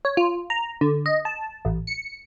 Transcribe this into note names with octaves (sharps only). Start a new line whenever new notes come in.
C#5
F4
A#5
D3
D#5
A5
A1
C#7